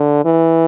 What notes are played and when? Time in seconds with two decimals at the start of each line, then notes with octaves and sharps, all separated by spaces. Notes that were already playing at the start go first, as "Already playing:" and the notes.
Already playing: D3
0.25 E3